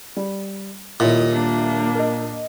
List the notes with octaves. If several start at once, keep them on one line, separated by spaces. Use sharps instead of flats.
G3
D#1 A#2 E4 C#5 D#5 E5
A#3 D4
A#4 D#5